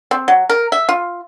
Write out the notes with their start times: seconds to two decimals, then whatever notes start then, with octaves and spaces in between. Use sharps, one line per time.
0.11 C4
0.28 F#3
0.49 A#4
0.72 E5
0.89 F4